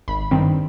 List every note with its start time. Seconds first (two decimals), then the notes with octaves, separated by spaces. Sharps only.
0.08 G#1 B5
0.31 G2 D#3 G3 C4